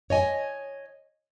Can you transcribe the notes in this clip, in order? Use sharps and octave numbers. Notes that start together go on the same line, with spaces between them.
C#5 D#5 G#5